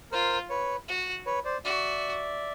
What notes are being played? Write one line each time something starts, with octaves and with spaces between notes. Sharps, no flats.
F4 A#4 C5
B4 C#5
F#4
B4 C#5
C5 D5
F#4 D5 E5